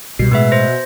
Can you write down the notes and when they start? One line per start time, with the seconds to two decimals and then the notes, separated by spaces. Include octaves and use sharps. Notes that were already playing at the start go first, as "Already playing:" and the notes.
0.19 C2 B2 G3 C7
0.32 A2 G#3 B3 B4 E5
0.52 C5 A#6